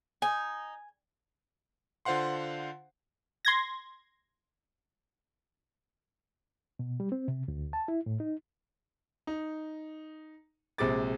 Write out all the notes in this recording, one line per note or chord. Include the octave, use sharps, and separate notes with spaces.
D#4 G#5
D3 F4 C5 F5 F#5 C6
C6 G#6 A#6
B2
G3
C4
C3
D2
A5
E4
A2
D#4
D#4
A#1 C3 G#3 D6 A6